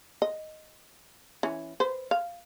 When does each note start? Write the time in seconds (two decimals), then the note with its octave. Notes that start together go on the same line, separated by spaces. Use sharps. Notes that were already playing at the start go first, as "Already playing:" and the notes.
0.22 D#5
1.43 E3 C#4
1.80 B4 C5
2.11 F5